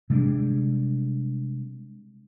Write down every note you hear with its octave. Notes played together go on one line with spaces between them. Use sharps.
C3 G3 G#3 D4